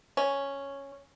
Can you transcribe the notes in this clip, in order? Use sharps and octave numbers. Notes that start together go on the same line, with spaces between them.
C#4